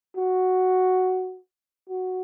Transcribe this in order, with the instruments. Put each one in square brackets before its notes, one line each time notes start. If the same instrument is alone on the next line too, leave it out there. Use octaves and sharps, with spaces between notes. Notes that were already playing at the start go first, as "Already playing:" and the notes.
[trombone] F#4
F#4